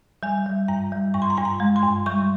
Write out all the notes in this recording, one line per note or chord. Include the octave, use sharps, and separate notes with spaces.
G3 G#5
G3
G2 A#5
G3
G2 C#6
C6
A#5
G2 C6
A#5
G#3
C6
G2
G3 C#6